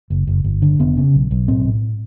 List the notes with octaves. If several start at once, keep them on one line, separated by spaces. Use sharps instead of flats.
F#1
F#1
G1
D3
F1 B3
C#3
B1
B1
A2 C4
A2